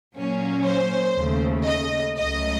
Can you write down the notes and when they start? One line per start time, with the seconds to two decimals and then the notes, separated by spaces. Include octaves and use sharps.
0.15 A#2 F#3 A#3 C#4
0.66 C5
1.16 D#2 C#3 A3
1.66 D#5
2.17 C#2 C#3 F#3 A3 D#5